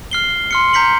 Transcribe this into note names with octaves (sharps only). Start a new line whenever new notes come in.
F6 C7 G7
C6 F6 C#7
A#5 G6 B6 C#7 F#7